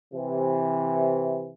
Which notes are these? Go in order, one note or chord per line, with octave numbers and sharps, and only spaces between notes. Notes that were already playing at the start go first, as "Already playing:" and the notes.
C3 E3